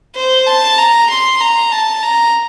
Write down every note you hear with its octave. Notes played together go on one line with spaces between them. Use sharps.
C5
A5
A#5
C6
A#5
A5
A#5